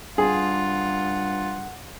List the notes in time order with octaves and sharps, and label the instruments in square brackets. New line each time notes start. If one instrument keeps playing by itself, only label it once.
[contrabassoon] G2 [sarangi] F4 [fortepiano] G#4 [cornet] F#5